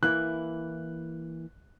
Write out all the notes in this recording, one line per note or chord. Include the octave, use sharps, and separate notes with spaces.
E3 A#3 E4 F#6